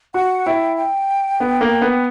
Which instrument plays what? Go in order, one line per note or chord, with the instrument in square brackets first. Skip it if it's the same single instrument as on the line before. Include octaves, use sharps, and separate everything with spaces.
[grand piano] F#4 [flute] F#5
[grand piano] E4 [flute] G5
[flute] G5
[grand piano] B3
A#3
B3